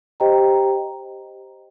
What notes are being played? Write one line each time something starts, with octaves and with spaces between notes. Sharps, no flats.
G4 C5 D#5 G5 A#5